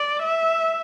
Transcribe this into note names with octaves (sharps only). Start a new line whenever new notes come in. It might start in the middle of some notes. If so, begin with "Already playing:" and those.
Already playing: D5
E5